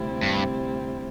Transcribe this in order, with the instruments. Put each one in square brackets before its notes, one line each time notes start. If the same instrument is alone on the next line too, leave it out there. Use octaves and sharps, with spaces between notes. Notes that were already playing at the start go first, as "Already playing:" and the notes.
Already playing: [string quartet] D2 C3 G3 C4 E4
[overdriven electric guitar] G2